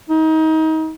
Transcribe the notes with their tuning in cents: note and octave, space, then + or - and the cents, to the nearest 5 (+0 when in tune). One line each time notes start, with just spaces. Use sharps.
D#4 +30